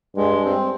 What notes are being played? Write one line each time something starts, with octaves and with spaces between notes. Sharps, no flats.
G2 G#3
C4